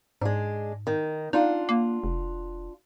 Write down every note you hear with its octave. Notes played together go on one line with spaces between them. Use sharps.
G#2 G#3 D4
D#3
D4 D#4 F4 F#5
A#3
F1